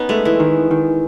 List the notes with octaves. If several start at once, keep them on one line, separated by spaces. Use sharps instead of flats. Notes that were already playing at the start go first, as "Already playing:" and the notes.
Already playing: B3 C#4 D#4
G#3 A3
E3
D#3
D#3